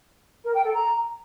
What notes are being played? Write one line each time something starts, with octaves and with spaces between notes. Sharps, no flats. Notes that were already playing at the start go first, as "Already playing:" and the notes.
A#4
G5
A4
A#5